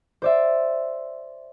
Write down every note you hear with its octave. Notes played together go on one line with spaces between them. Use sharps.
C5 D5 E5